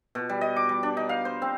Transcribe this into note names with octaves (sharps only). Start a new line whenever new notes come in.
B2
G3
D#5
D6
G3
D4
D#4
F5
C5
C4